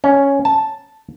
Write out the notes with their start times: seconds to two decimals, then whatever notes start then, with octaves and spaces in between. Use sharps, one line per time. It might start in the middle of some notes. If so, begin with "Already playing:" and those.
0.04 C#4
0.45 A5